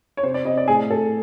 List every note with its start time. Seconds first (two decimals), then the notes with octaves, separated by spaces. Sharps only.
0.17 C#5
0.23 C3 C5
0.34 D5
0.45 C3 D#5
0.58 D5
0.68 A2 G#4
0.91 A2 A4